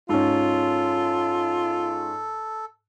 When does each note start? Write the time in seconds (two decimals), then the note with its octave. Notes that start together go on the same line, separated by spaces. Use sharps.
0.09 G#2 C#4 F4 A4